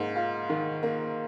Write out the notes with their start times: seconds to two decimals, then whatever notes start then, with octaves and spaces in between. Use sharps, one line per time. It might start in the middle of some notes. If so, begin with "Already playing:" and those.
Already playing: G#2 A#3
0.16 F4
0.49 D#3
0.83 A#3